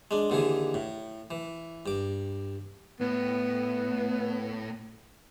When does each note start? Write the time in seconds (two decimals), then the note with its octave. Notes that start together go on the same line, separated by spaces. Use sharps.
0.11 G#3 D4
0.30 D#2 D3 E3 G#4
0.74 A2
1.31 E3
1.86 G2 D6
3.00 A2 B3